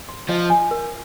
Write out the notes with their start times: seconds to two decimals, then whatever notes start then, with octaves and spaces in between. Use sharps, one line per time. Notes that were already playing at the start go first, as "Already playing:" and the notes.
0.09 C6
0.29 F3 D#5
0.50 G#5
0.71 A#4